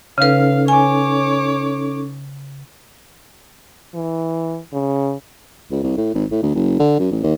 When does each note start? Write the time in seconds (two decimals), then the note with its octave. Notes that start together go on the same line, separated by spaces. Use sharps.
0.18 C#3 C#4 D#4 A4 B4 F5
0.68 C#5 G#5 D6
3.95 E3
4.73 C#3
5.71 C#2
5.83 C2
5.97 A2
6.14 G#1
6.31 A2
6.43 D2
6.55 F#1
6.80 D3
6.99 F#2
7.12 A1
7.23 D#2